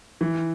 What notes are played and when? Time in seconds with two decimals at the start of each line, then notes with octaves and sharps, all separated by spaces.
0.21 E3